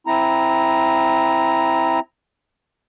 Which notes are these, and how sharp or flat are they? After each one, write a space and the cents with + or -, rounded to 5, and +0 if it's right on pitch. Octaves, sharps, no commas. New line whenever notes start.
C4 +0 E4 +0 A#5 +0